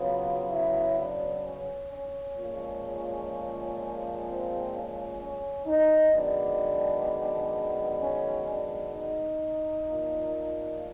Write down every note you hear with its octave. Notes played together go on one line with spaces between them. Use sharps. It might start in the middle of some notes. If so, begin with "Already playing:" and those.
Already playing: C#3 F#3 B3 F4
E4
D4
C#4
C#4
A#2 F3 G#3
C4
C#4
C#4
D#4
F#2 D#3 G#3 B3 D4
C#4
D4
D#4
A#2 F3 A#3